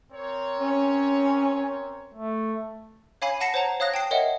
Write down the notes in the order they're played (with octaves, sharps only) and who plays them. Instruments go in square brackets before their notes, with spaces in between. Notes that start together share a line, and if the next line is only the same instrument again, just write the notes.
[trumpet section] C4 A#4 C#5
[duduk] C#4
A3
[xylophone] C#5 F5 G#5 B5 C7
F#5 A5 A#6 C7 C#7 E7
C5 C#5 F#5 A5 A#5
C#5 F5 D#6 F#6 A#6
G5 A5 C7
A#4 C#5 D#5 E5 F#5